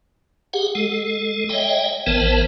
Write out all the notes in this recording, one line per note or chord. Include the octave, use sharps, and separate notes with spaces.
G4 G#4 F#5
G#3 A4
C#5 D#5 E5 G5
A1 E3 B3 A#4 C5 A5